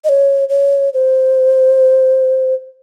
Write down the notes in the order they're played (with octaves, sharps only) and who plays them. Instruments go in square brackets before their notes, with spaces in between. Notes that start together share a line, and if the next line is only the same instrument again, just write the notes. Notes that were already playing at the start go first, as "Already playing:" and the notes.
[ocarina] D#5
C#5
C#5
C5